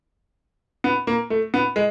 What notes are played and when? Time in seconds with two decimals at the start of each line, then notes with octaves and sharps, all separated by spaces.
0.84 B3
1.07 A#3
1.30 A3
1.54 B3
1.76 G#3